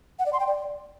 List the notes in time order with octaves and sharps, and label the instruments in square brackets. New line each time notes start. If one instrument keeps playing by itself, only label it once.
[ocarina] F#5
D5
C6
G5
D5